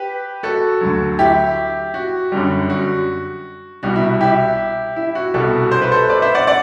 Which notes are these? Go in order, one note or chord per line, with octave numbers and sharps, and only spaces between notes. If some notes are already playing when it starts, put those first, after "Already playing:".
Already playing: G4 B4
F#4 A4
D2 D3 F#3
E4 G4
F#4
F#2 D3 G3
F#4
C2 B2 G3 F#4
E4
E4 G4
E4
F#4
C2 B2 G3 F#4 A4
C5
B4
A4 C5
B4 D5
C5 E5
D5 F#5
D5 F#5